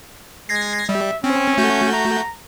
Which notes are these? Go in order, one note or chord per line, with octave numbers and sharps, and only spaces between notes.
G#3 G#6 A#6 C7
G3 E5
C4 C#4
A3 F#4 G6
A#5